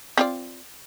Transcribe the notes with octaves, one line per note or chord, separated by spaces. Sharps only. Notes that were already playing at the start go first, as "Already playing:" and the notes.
C4 F4 D5